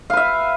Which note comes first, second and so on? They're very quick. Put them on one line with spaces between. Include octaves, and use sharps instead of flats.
F5 B4 E5